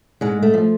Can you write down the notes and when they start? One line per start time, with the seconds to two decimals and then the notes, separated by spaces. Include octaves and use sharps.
0.21 G#2 G#3
0.42 A3
0.54 F3